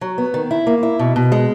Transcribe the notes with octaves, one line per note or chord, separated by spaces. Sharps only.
F#3
B3
D#3
E4
A#3
E4
B2
B2
G#3